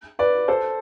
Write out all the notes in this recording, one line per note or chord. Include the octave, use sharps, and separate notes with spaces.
B4 D5
A4 C5